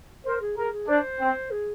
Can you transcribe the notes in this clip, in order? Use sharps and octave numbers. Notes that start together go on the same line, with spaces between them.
A#4 C5
G#4
G#4 A#4
G#4
D4 C5
C4
G#4